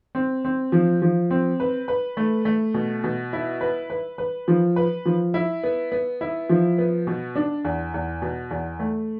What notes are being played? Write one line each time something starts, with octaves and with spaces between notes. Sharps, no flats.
C4
C4
F3
F3
C4
B4
B4
A3
A3
B2
B2
E4
B4
B4
B4
F3
B4
F3
E4
B3
B3
E4
F3
B3
B2
D4
E2
E2
B2
E2
A3